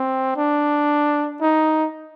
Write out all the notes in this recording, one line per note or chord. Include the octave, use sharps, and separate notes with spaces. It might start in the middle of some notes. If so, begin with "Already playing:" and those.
Already playing: C4
D4
D#4